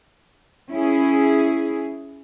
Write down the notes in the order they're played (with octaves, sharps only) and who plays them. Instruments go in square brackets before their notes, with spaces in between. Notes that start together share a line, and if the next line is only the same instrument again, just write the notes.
[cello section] C#4 E4 G#4